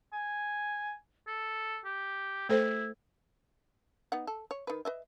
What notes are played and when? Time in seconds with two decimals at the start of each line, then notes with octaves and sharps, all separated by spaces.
0.13 G#5
1.27 A4
1.85 G4
2.49 A3 E4 A4 C5
4.12 B3 D#4 F#5
4.27 A4
4.51 C#5
4.67 D#3 B4
4.85 B4 D#5 E5